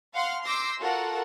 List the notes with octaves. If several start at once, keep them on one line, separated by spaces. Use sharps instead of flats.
F5 F#5 C6 F6
C6 D6 E6 G6 A#6 C7
F4 F#4 A4 A#4 F#5